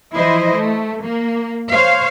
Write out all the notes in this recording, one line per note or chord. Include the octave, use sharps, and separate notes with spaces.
E3 F3 E4 C5 D#5
A3
A#3
C5 C#5 F5